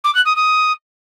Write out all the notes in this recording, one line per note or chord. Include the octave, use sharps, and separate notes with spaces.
D6
F#6
D#6
D#6